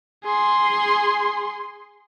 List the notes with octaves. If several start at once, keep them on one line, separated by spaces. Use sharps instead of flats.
G#4 C6